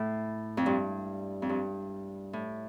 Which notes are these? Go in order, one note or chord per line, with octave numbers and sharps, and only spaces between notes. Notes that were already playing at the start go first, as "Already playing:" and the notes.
Already playing: A2
F2
G2
F2
G2
A2